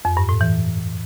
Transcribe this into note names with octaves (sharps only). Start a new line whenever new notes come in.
F2
G2
A2
E3